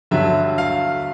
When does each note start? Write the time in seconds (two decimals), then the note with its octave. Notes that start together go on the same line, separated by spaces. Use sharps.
0.11 G2 D3 F#3 E5
0.58 F5